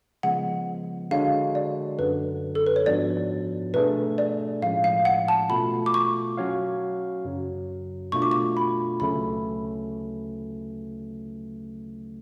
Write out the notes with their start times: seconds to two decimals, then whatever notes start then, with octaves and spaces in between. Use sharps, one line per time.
0.23 C#3 F3 G#3 B3 F#5
1.11 D3 G#3 D4 F#4 C#5 F5
1.55 D5
1.99 F#2 D3 F#3 B4
2.55 A4
2.66 B4
2.76 C#5
2.86 G#2 F3 B3 D4 F#4 D5
3.74 B2 A3 D4 G#4 B4
4.18 D5
4.62 A2 F3 G#3 C#4 F5
4.84 F5
5.05 F#5
5.28 A5
5.50 B2 A3 F4 B5
5.86 D6
5.94 C#6
6.37 F#3 C#4 F#4 C#5 F5
7.25 F#2 C#3 F#3
8.12 B2 A3 D4 F4 C#6
8.22 D6
8.31 C#6
8.57 B5
9.00 D2 C#3 F#3 A3 C#4 B5